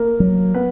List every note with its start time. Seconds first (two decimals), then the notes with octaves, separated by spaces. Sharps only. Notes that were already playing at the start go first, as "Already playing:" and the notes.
Already playing: A#3 A#4
0.20 F#3
0.54 B3 B4